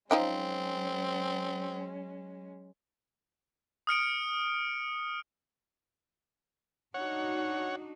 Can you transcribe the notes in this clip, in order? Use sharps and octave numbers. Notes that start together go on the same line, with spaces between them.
F3 F#3 G#3 C4 C#4 D#4 G5
D#6 F6 C#7 D7
D4 D#4 F#4 C#5 F#5